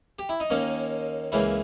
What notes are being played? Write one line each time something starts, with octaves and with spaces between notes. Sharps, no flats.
G4
E4
D#4
D#2 D#3 A#3 C#4
C#2 C#3 E3 A#3 E4